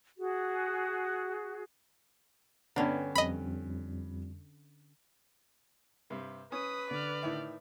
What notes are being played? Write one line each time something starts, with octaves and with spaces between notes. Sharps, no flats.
F#4 G#4
G2 D3 B3 C#4
F2 G3 D#5 B5
G2 C3
C#4 B4 D#6
D3 D5 F6
A2 D#3 E5